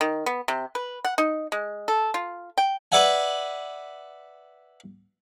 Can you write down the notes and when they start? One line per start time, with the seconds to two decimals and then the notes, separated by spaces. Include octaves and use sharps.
0.01 D#3
0.26 B3
0.48 C3
0.75 B4
1.04 F#5
1.18 D#4
1.52 G#3
1.88 A4
2.14 F4
2.58 G5
2.92 B4 D5 E5 F#5 G#5